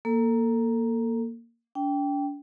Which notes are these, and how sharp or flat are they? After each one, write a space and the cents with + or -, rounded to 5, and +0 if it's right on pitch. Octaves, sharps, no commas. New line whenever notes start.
A#3 +0 A4 +25
D4 -40 G5 +0